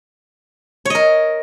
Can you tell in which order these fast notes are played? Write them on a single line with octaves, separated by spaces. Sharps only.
C#5 D#5 A#4